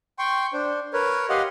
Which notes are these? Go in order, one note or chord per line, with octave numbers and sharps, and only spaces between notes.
G5 C6 C#6
D4 C5
A#4 B4 C#5
G4 D#5 F5 F#5 C6